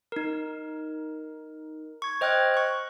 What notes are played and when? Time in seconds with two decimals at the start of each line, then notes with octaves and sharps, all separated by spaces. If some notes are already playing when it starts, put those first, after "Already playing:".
0.12 D#4 A#4
2.02 C#6 G#6
2.21 C5 D#5 G5 F6 F#6 G#6
2.54 C#6 F#6